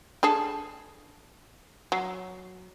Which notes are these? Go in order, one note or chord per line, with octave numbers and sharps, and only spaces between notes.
D4 G#4 A4
F#3